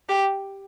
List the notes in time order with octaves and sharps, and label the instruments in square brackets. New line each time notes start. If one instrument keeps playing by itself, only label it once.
[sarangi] G4